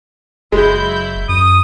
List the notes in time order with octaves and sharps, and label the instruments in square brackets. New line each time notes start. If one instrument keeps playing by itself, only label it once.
[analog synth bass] F#1 [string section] F#3 E4 G6 [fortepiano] G#3
[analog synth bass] F#2 [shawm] D#6